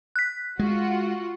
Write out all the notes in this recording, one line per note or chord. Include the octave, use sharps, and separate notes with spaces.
F#6 B6
G#3 F4 F#4 F#5